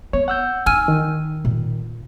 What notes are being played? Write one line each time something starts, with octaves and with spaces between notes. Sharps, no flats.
B3 C#5
F#5 E6 G6
D#4 G#5 E6 F6 D#7
D#3
A#2